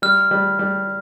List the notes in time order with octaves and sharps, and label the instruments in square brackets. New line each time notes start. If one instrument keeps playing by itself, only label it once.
[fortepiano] G3 [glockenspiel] F6
[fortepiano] G3
G3